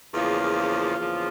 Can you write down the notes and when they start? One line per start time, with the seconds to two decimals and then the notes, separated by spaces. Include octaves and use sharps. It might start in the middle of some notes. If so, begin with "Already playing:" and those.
0.14 E2 C#3 F3 A#3 F4
0.98 E2 C#3 F3 A#3